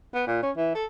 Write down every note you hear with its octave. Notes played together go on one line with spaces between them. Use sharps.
B3
A#2
C#4
E3
A4